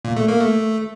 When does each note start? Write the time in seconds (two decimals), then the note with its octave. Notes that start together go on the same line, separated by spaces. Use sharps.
0.05 A#2
0.16 A3
0.28 A#3
0.40 A3